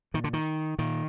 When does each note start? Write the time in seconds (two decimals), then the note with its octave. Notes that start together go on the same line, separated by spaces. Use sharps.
0.14 A#2 D#3
0.24 D3
0.33 D#3
0.79 A#2 D#3